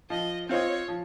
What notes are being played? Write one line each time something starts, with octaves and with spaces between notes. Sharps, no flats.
F3 D#5
C4 F4 C5 C#5 D#5
F3